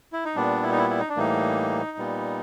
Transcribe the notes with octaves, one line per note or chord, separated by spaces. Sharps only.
E4
D#4
A#2 G3 B3 D4
E4
D#4
E4
E4
D#4
D4
A2 E3 G3 A#3 D#4
A#2 G3 B3